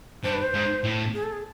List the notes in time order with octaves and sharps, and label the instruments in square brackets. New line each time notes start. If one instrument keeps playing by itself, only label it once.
[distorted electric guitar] G2 [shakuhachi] C5
[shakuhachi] B4
C5
[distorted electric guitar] G#2
A2
[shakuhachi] G#4
A4
G#4